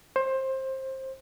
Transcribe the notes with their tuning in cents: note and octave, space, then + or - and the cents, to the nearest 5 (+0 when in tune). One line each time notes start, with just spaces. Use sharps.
C5 +20